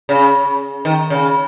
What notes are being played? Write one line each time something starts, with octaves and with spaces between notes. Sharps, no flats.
C#3
D#3
C#3